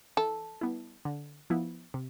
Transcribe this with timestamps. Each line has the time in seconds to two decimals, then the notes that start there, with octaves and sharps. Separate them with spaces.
0.17 E3 A4
0.61 G3 B3 E4
1.05 D3
1.50 F3 B3 E4
1.94 C3